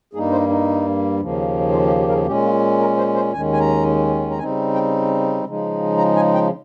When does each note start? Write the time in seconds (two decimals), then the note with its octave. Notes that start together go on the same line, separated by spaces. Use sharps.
0.13 G2 G3 A#3 D#4 G#4
0.32 C5
0.49 D#4
1.20 D#2 C#3 F3 A#3
1.73 F4
1.86 G4
2.00 G4
2.09 A#4
2.14 G#4
2.27 A#2 G#3 C#4 G4
2.44 F4
2.80 A#4
2.98 C5
3.15 C5
3.33 D#2 D#3 G#3 C#4 G#5
3.53 G#5
3.60 A#5
4.31 A#5
4.38 C#3 G3 C4 D#4 G#5
4.74 G5
5.45 C#3 F3 G#3 D#4
5.98 A#5
6.15 G#5
6.34 G5